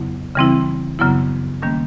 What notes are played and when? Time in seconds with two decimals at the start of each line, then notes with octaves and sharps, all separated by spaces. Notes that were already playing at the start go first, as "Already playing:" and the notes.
Already playing: F2 C#3 F#3 B3 E4
0.36 C#3 E3 G3 C4 E4
0.99 F#2 C#3 F#3 B3 E4
1.62 D#3 G3 A#3 C#4